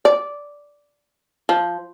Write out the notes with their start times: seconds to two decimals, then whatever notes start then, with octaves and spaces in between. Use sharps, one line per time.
0.05 D5
1.49 F3